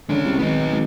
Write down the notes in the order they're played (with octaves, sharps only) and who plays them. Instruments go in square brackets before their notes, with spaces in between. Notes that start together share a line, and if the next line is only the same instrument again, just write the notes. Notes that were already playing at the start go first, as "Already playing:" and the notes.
[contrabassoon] D3 [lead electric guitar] G#3 C#4
[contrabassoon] C2
[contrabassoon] G#1 [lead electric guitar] B3 D#4
[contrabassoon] G#1